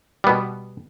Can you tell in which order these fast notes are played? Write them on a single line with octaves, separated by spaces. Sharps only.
G3 B3 B2